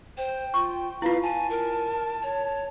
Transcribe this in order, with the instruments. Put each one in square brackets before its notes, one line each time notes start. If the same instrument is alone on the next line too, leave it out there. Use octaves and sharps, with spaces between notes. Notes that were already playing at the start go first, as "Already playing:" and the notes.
[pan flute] C5 [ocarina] G5
[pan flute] F4 [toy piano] C#6
[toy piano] E4 F4 [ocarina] B4 [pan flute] F5
[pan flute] G#5 [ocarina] A5
[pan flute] A#4
C#5